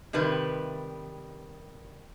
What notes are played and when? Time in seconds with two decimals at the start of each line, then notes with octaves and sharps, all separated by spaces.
0.13 C3 D#3 G3 B4